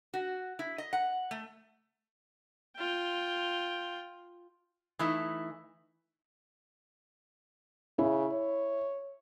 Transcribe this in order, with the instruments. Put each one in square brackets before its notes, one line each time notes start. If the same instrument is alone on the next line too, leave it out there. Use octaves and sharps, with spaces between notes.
[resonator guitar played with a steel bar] F#4
E4
D#5
F#5
A3
[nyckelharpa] F4 G5
[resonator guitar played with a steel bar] E3 A3 D#4 E4
[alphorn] C#3 [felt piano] E4
[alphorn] C#5